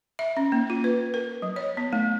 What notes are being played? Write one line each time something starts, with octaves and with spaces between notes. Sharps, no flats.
E5
C#4
A#3
F4
B4
A#4
F#3
C#5
B3
A3